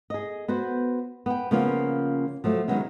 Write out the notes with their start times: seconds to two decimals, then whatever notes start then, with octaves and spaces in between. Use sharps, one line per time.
0.10 G#4 D#5
0.48 B3 F#4 C5
1.26 B3 G5
1.51 C#3 F3 A#3 B3 C#4 F4
2.44 F3 F#3 A3
2.68 D#3 F#3 G#3 B3 C#4